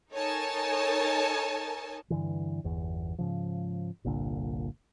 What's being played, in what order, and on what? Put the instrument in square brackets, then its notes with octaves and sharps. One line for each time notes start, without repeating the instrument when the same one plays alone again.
[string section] D#4 A4 A#4 C#5 G#5 A5
[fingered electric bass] G2 D3 E3
G1 E2
G#2 C#3 F3
G1 C2 A#2 D3